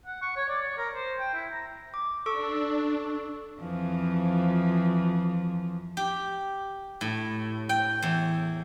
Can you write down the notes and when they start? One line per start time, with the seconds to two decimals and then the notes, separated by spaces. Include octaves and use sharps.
0.06 F#5
0.22 C#6
0.36 C#5
0.48 D5
0.61 C#5
0.78 A#4
0.95 C5
1.19 G5
1.34 E4
1.52 A#5
1.94 D6
2.26 D4 A4 C#6 E6
3.60 F2 E3 F3
5.97 G4
7.01 A2
7.69 G5
8.03 E2